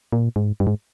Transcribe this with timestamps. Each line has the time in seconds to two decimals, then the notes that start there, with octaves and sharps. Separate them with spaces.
0.12 A#2
0.36 G#2
0.60 G2
0.67 G#2